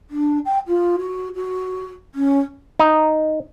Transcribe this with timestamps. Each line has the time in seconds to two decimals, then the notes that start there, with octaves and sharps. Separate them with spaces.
0.10 D4
0.45 G5
0.67 F4
0.99 F#4
1.35 F#4
2.15 C#4
2.79 D#4